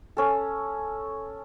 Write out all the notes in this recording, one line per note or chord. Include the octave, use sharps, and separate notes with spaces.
C#4 A4